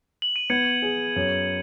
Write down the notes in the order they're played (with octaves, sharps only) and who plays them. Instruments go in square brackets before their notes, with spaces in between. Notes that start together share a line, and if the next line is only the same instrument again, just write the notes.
[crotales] F#7
D#7
[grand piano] B3 [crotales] G#6 C#7
[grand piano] G#4
F#2